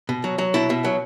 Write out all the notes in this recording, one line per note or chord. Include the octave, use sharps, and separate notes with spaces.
B2
F#3
F#3
B2 E4
B2
F#3